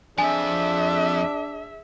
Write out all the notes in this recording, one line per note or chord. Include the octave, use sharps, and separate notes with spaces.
F2 F3 D4 G#4 E5 G#5